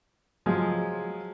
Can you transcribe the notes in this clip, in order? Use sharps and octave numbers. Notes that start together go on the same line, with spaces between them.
F3 F#3 G#3